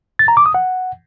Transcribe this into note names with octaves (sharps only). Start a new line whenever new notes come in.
A6
A#5
D6
D#6
F#5